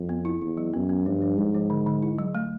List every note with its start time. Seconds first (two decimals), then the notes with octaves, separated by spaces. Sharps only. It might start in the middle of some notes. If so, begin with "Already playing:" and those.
Already playing: F2
0.09 B3
0.25 E4
0.41 E2 E4
0.57 F#3
0.74 F#2 B3
0.89 B3
1.06 G2 F3
1.22 F3
1.38 G#2 F3
1.54 F3
1.70 D3
1.87 D3
2.02 E4
2.18 F#3
2.35 A3